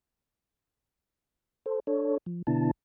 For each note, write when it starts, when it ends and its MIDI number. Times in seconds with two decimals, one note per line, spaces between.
1.66 1.80 69
1.66 1.80 72
1.87 2.18 62
1.87 2.18 69
1.87 2.18 73
2.26 2.42 53
2.47 2.71 47
2.47 2.71 50
2.47 2.71 59
2.47 2.71 62
2.47 2.71 64
2.47 2.71 81